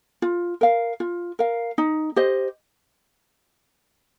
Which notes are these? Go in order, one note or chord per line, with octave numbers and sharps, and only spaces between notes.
F4
A#4 F5
F4
A#4 F5
D#4
G4 C5 D#5